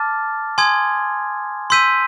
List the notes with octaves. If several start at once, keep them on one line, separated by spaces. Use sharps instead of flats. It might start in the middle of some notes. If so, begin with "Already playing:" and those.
Already playing: A5 D6 F6 A6
G#5 C6 D#6 G#6
C6 E6 G6 B6 D#7